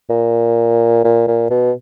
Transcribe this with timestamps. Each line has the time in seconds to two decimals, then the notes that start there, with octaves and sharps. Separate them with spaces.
0.10 A#2
1.04 A#2
1.27 A#2
1.50 B2